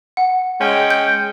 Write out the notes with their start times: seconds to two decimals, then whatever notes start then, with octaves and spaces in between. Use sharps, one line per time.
0.17 F#5
0.59 G#3 C#4 G5
0.90 G6